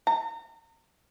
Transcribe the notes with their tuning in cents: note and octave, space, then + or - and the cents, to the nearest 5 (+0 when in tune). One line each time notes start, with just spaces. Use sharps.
A#5 -30